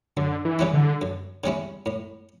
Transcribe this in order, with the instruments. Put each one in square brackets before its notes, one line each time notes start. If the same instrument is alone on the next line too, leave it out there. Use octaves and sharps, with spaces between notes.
[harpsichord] F#2 [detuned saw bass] D3
[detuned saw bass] E3
[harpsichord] C#3 G3 C#4 E4
[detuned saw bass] D3
[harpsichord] F#2
C#3 G3 C#4 E4
A2